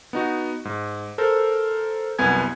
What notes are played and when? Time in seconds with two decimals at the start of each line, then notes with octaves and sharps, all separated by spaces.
0.13 B3 D#4 F#4
0.65 G#2
1.18 A4 A#4 C5
2.19 C2 F#2 B3 G#5 G#6